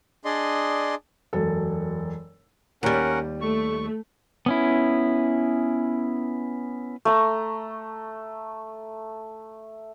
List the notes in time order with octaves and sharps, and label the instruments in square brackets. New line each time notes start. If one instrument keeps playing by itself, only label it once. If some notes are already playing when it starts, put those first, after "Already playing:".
[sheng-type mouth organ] D4 G#4 D5 D#5 C6
[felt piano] E1 F#2 A4
[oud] D#2 G3 [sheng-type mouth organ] C#4 A#4 F#5
[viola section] A3 [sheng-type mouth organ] C#6
[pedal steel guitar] B3 C#4 E4
[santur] A3 A#5